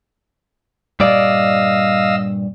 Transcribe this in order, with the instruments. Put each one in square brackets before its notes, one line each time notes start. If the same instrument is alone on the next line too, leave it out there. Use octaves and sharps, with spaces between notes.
[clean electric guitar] G2 A#2 D5 [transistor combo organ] D#5 F5 E6